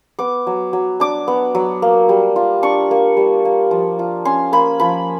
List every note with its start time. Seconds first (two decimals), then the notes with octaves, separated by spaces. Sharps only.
0.19 B3 D6
0.47 F#3
0.73 F#3
1.00 D4 D6
1.28 B3
1.55 F#3
1.82 A#3
2.09 G3
2.36 F4
2.63 D4 C#6
2.91 A#3
3.17 G3
3.45 A#3
3.71 F3
3.99 F4
4.25 C#4 C6
4.52 A#3 B5
4.80 F3 B5